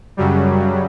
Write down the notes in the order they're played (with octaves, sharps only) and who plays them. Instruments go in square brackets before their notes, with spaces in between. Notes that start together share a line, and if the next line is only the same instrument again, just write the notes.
[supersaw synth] F#2 C#3 F#3 G3